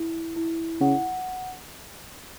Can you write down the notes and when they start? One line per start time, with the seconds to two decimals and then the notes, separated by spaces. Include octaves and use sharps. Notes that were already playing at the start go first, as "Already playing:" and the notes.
Already playing: E4
0.36 E4
0.81 C#3 F#5